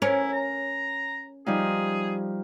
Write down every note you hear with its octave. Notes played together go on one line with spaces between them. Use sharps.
C#4 E4 A#4
A#5
F3 G3 D#4 G#4